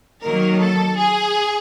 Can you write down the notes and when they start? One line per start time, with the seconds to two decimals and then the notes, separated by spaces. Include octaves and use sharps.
0.24 D#3 F#3 A#3 A#4
0.61 A4
0.98 G#4